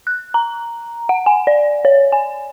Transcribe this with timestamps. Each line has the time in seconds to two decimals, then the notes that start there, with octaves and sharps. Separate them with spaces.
0.07 F#6
0.34 A#5
1.09 F#5
1.26 G#5
1.47 D5
1.85 C#5
2.12 G#5